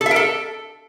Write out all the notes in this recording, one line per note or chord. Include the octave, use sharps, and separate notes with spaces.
A4
E5
A#4
A4